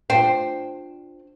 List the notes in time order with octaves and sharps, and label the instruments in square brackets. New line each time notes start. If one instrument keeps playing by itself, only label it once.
[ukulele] D4 F4 G5 [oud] C5